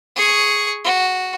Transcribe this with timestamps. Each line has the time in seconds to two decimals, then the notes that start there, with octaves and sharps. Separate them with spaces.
0.16 G#4 C#6
0.84 F#4